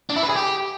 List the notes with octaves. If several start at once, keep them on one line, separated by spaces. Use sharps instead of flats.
D4
E4
B4
G#4
G4